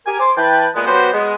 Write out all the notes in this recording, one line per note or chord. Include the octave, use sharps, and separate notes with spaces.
G4 A#4 G#5
C5 C6 D6
E3 B4 G5 A5
A#2 G#3 B3
F#3 B3 F#4 G4 B4 C5
G#3 B3